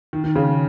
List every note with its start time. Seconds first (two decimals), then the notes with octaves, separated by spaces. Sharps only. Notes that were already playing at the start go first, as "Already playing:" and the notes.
0.13 D#3
0.24 D#3
0.35 C#3